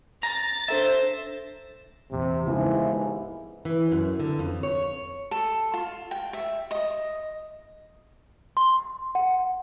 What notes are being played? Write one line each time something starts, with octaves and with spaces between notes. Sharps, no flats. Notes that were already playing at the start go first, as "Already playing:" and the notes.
A#5 A6
D4 A4 C5 E5 A#6 E7
A#1 E2 C3
D#2 G#2 C#3 E3 F3 B3 C#4 E4
E3
F#2
D3
F2
C#5
A4
F4
G5
E5
D#5
C6
F#5